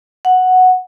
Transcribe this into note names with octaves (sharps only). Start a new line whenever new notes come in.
F#5